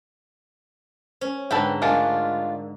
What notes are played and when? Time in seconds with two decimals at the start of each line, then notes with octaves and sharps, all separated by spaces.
1.21 C#4 C5
1.51 G#2 D3 A4 B4 G5
1.82 G#3 A3 D4 F4 A#4 F5 F#5